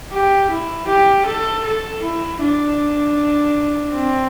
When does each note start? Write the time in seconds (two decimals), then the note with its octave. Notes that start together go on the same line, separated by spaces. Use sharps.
0.12 G4
0.51 E4
0.88 G4
1.26 A4
1.65 A4
2.03 E4
2.41 D4
3.93 C4